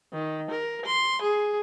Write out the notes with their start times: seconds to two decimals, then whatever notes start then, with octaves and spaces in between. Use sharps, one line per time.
0.13 D#3
0.50 A#4
0.85 C6
1.22 G#4